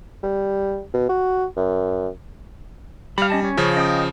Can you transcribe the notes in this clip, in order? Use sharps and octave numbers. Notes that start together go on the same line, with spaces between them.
G3
B2
F#4
F#2
G3 F5 B5
C#4 D#5 A5
C#4 C#5
C#3 F3
D#5 G5 D#6